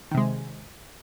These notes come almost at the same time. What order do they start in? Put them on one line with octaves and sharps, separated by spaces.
D#3 C3 G#3